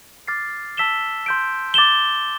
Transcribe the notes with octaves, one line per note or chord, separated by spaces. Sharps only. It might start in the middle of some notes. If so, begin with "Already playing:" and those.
D6 F6 A6 C7
A5 E6 B6 E7 G7
C6 G6 D7
D6 A6 E7 G7